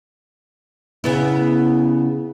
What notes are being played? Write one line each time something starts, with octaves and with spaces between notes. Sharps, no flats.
C#3 B3 E4